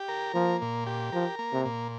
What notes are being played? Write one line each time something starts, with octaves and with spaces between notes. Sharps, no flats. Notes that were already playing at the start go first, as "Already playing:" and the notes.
Already playing: G4
A#4
F3 A#3
A#2
G4
F3 A#4
A#3
C3
A#2